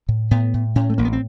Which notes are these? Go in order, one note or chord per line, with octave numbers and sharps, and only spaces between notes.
A2
A2 B3
A2
A2 C#4
A3
A1 A#3
B3
C4